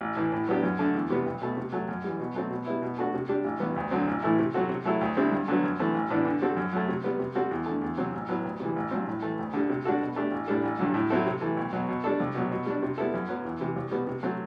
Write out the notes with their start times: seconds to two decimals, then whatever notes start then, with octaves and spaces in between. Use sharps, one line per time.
0.01 A1
0.16 A2 E3
0.32 A2
0.48 F#3 B3 D4 G4
0.63 F#2
0.79 D3 A3
0.95 E2
1.10 C3 G3 B3
1.26 B1
1.42 B2 A3
1.57 C3
1.72 F#3 A3
1.88 F#2
2.04 E3 G3
2.20 B2
2.35 F#3 A3 C4
2.50 B2
2.66 G3 B3 E4
2.82 B2
2.98 A3 D4 F#4 A4
3.14 C3
3.29 G3 D4 G4
3.44 A1
3.60 G2 E3 B3
3.76 D2
3.91 D3 F#3 C4
4.07 A1
4.23 A2 E3 A3 E4
4.39 C3
4.54 F#3 C4 F#4 A4
4.69 C3
4.85 F#3 A3 E4 A4
5.01 D2
5.17 D3 G3 C4 E4
5.32 G2
5.48 D3 F#3 B3
5.64 F#2
5.79 E3 A3 C4
5.94 A1
6.10 A2 E3 B3 D4
6.25 D3
6.42 G3 C4 F#4 A4
6.57 F#2
6.73 F#3 A3
6.88 C3
7.04 G3 B3
7.19 C3
7.35 G3 C4 F#4 A4
7.51 E2
7.66 D3 A3
7.82 E2
7.98 C3 F#3 C4
8.14 A1
8.28 A2 F#3 B3
8.44 D2
8.60 C3 E3 G3
8.76 A1
8.91 G2 F#3 C4
9.08 A2
9.22 E3 A3
9.39 D2
9.53 D3 G3
9.69 C3
9.85 G3 D4 F#4 A4
10.01 B2
10.16 A3 D4 G4
10.31 A1
10.48 A2 G3 D4 A4
10.63 A1
10.79 G2 D3 F#3
10.94 A2
11.10 F#3 C4 E4 A4
11.26 C3
11.41 E3 A3
11.57 B1
11.73 B2 F#3
11.89 B2
12.04 G3 D4 A4
12.20 C2
12.35 B2 F#3
12.51 B2
12.66 G3 D4
12.83 C3
12.98 G3 B3 E4 A4
13.14 F#2
13.28 F#3 B3
13.45 E2
13.60 C3 E3
13.76 C2
13.91 B2 G3 B3
14.07 C3
14.23 F#3 A3 C4